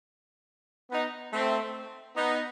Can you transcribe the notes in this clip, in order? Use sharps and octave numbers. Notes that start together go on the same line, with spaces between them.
B3 D#4
A3 C4
B3 D#4